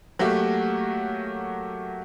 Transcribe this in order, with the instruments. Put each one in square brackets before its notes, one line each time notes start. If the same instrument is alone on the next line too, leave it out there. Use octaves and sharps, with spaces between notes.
[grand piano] F#3 A3 A#3 F#4 G4